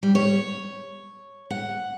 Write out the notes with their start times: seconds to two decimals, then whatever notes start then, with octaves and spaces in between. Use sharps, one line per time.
0.03 G3
0.15 C#5
1.51 F#5